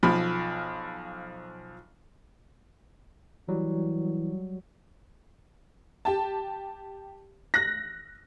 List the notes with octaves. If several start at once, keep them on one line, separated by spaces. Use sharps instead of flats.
B1 F3 B5
E3 F#3 G3
G4 A5
F#6 A#6